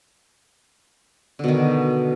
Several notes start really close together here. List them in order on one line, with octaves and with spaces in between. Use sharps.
D3 B2 D#3